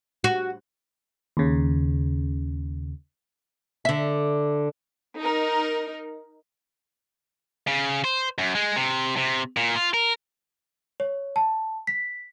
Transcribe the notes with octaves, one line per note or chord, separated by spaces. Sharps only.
F#4
D#2 C#3
D3 E5
D#4 A#4
C#3
C5
F#2
G#3
C3
C3
A#2
F4
A#4
C#5
A5
B6